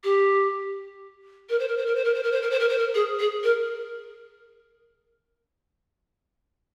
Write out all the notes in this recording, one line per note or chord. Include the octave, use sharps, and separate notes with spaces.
G4
A#4
C5
A#4
C5
A#4
C5
A#4
C5
A#4
C5
A#4
C5
A#4
C5
A#4
G#4
G#4
A#4